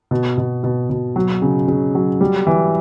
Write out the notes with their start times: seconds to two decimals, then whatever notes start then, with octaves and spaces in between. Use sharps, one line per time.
0.11 B2
0.38 B2
0.64 B2
0.90 B2
1.16 F#3
1.42 C#3
1.68 C#3
1.95 F#3
2.21 G3
2.47 E3